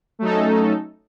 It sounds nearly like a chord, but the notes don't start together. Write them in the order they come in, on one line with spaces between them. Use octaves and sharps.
A3 F#3 D#4 A4 C#4